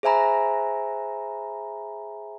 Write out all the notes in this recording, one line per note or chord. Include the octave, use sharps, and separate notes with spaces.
G#4 C5 E5 G#5 A#5 B5